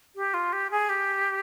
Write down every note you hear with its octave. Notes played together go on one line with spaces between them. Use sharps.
G4
F4
G4
G#4
G4